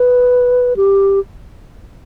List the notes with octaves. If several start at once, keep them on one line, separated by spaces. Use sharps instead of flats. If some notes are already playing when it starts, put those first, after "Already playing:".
Already playing: B4
G4